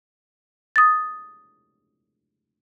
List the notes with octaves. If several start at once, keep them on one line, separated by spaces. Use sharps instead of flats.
D#6 A6